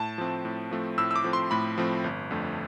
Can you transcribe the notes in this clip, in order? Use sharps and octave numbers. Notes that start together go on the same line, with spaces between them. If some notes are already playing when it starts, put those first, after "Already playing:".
Already playing: A2 A5
F3 A3 C4
A2
F3 A3 C4
A2 E6
E6
D6
F3 A3 C4
C6
A2 B5
F3 A3 C4
G1
F2 D3 A3